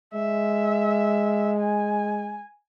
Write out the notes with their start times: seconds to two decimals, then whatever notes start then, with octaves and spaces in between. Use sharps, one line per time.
0.14 G#3 E5
1.59 G#5